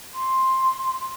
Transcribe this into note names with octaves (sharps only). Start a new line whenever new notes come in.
C6